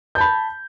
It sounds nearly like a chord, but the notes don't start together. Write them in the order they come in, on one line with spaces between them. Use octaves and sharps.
G6 A5 B5